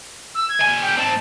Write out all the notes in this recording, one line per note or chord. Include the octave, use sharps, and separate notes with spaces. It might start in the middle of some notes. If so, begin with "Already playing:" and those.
E6
G#6
G3 G#5
G5
G#2 C4 A5